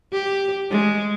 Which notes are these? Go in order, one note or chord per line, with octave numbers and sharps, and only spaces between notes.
G4
G#3